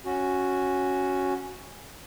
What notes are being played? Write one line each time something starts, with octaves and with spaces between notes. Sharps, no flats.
C#4 F#4